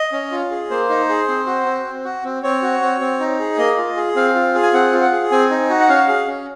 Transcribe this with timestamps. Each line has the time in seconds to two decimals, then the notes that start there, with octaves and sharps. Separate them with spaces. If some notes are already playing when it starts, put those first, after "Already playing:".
Already playing: D#5
0.12 C#4
0.32 F4
0.51 G#4
0.70 A#3 C5
0.89 D#4
1.09 G#4
1.28 C4
1.46 F#4
1.66 C4
1.85 C4
2.04 F#4
2.24 C4
2.43 C4 C#5
2.62 F#4
2.82 C4
3.01 C4
3.20 D#4
3.39 G#4
3.58 A#3 D#5
3.77 F4
3.97 G#4
4.15 C4 F5
4.35 F4
4.54 G#4
4.63 G#5
4.73 C4 F#5
4.93 F4
5.02 F#5
5.12 G#4
5.31 C4 G#5
5.50 D#4
5.70 F#4
5.80 F#5
5.89 C#4 F5
6.08 G#4
6.27 C#4